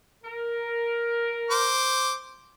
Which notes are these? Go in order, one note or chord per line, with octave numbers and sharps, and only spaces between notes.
A#4
C5 D6